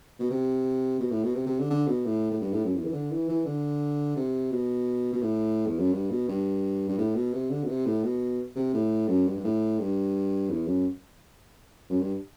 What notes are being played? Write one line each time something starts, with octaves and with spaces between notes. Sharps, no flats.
B2
C3
B2
A2
B2
C3
C3
D3
D3
B2
A2
A2
G2
A2
F#2
E2
E3
D3
E3
E3
D3
C3
B2
B2
A2
E2
F#2
G2
B2
G2
G2
A2
B2
C3
D3
B2
C3
A2
B2
C3
A2
F#2
G2
G2
A2
G2
E2
F#2
F#2
G2